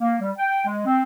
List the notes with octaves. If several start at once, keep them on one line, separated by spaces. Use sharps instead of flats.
A#3
G3
G5
G#3
C4